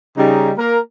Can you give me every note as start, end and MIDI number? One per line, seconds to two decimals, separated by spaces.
0.17 0.52 49
0.17 0.52 55
0.17 0.52 63
0.58 0.78 58
0.58 0.78 70